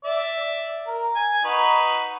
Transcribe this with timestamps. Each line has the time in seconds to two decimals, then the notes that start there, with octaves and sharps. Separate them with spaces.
0.04 D5 E5
0.87 A#4
1.15 G#5
1.45 D#4 F#4 B4